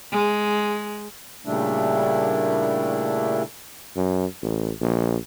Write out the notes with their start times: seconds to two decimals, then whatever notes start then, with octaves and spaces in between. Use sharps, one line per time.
0.12 G#3
1.46 A#2 C#3 G3 A3 D4 E4
3.96 F#2
4.42 A1
4.81 A#1